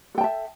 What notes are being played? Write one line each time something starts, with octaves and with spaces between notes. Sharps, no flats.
A4 E5 G5 A5